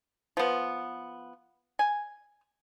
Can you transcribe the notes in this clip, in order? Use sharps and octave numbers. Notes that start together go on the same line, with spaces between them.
F3 B3
G#5